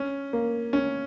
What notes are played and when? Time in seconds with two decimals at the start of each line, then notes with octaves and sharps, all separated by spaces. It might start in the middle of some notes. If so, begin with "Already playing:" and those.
Already playing: C#4
0.33 A#3
0.73 C#4